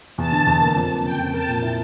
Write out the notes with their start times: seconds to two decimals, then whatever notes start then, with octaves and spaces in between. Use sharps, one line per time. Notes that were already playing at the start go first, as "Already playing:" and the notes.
0.18 E2 A5
0.32 D3
0.47 E2
0.61 A#3
0.76 F2
0.90 F2
1.04 C#3 G5
1.19 F2
1.34 A#4 A5
1.48 A#2
1.62 E4